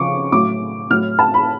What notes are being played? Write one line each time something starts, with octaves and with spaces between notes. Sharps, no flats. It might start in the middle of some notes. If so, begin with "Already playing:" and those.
Already playing: C#3 F3 C#6 D6
A2 F#3 D6
A2 F#3 F6
A5
B5